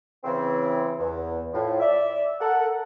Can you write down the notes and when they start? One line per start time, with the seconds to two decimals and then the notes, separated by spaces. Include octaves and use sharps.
0.24 C#3 E3 C4
0.98 E2
1.53 A2 F3
1.80 D5 E5
2.39 A4 A#4 F#5